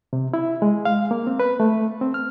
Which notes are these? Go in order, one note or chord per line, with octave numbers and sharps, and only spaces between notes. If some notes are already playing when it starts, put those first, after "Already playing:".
C3
E4
G#3
F5
A#3
C4
B4
A3
C4
F6